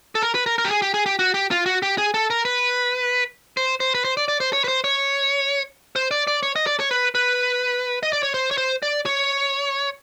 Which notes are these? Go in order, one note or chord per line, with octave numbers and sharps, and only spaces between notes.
A4
A#4
B4
A#4
A#4
G4
G#4
G4
G#4
G4
F#4
G4
F4
F#4
G4
G#4
A4
A#4
B4
C5
C5
B4
C5
D5
D5
C5
C#5
B4
C5
C#5
C5
D5
D5
C#5
D#5
D5
C#5
B4
B4
D#5
D5
C#5
C5
C#5
C5
D5
C#5